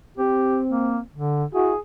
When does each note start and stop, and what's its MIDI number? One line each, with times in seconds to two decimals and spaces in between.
0.17 0.99 60
0.17 0.59 67
0.69 0.98 58
1.14 1.44 50
1.53 1.71 64
1.53 1.71 66
1.53 1.78 68